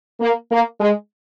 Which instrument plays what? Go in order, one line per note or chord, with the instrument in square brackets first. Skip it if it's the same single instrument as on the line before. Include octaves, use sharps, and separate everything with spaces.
[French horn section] A#3
A#3
G#3